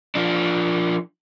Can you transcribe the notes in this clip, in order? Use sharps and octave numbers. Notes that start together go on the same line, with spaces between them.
F3 D4